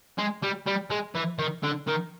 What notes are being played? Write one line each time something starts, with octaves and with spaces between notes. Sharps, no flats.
G#3
G3
G3
G#3
E3
D#3
D3
D#3